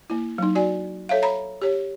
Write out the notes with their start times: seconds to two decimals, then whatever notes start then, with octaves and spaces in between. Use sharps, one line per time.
0.10 A#3 E4
0.38 F#3 D#4
0.55 F#4 D5 G#5
1.09 A4 C#5 E5 F5
1.22 C#5 A#5 B5
1.61 G4 C#5